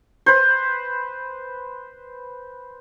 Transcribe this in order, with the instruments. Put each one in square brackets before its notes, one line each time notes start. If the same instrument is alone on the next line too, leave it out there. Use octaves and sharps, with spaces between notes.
[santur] B4 C5